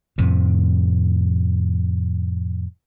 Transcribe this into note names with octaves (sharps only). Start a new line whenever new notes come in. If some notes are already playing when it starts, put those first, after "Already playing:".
F2 A2 C3